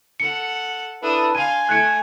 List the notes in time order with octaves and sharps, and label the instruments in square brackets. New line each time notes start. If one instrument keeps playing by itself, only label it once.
[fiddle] A4 F#5 [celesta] C#7
[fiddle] D4 D#6 [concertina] E4 A4 B4
[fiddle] F5 C6 [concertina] G#5 [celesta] D#7
[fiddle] A3 [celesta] F#6 G#6 C#7